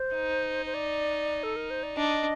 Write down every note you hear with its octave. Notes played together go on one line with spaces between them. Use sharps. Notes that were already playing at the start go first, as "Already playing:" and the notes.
Already playing: C5
D#4
C5
D5
A4
A#4
C5
D5
D4 D#5